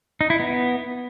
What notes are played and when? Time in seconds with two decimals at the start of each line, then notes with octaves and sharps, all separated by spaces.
0.21 D#4
0.30 E4
0.40 B3